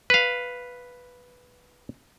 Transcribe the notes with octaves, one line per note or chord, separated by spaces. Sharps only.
B4 F5